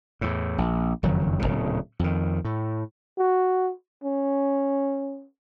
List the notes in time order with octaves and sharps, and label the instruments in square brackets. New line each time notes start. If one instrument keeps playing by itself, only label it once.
[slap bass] E2 A2
A#1
F#1 F2 D#3 F#3
D1 C2 A#2 C#3
F2 D#3
A2
[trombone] F#4
C#4